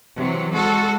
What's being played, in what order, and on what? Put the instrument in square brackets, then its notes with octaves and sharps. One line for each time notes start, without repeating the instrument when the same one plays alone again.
[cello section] C3 E3 F#3
G#3 F#4 A4